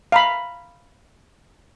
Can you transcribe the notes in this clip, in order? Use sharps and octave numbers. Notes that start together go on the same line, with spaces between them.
F5 A#5 B5